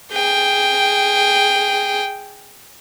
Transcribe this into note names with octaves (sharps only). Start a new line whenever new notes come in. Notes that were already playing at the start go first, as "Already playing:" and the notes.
G#4 G5